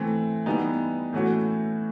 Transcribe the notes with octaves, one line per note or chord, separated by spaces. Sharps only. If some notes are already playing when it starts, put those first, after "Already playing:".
Already playing: E3 A3 C4
E3 G3 B3 D#4
A2 E3 A3 C#4 F#4